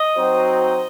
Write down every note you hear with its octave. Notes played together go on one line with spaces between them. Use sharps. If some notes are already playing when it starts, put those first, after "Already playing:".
Already playing: D#5
F#3 C4 D#4 F#4 C5